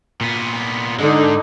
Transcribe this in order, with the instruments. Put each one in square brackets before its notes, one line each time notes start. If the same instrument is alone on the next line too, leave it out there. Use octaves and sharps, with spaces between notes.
[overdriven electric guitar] A#2 B3
[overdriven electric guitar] G#2 G#3 [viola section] D3 D#4